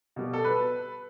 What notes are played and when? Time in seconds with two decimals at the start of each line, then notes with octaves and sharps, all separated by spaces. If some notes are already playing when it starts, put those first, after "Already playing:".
0.16 B2 G3
0.33 A4
0.44 B4